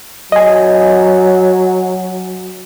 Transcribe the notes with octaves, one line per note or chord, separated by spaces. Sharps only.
F#3 D#5 G#5